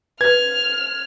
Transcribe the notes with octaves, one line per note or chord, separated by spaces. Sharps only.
B4 F6 G#6